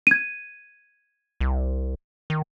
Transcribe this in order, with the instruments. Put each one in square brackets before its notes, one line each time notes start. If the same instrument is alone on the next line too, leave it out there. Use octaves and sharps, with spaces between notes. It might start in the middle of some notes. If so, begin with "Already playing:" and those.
[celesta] G#6 D#7
[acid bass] C2
D#3